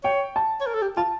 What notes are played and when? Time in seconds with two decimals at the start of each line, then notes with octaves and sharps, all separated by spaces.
0.04 C#5 G5
0.36 A5
0.61 C#5
0.66 A#4
0.74 A4
0.82 G4
0.97 F4 A5